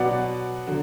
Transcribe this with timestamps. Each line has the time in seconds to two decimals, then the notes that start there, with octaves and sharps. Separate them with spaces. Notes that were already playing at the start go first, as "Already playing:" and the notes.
Already playing: B2 F#3 B3 D5 F#5
0.67 D3 F#3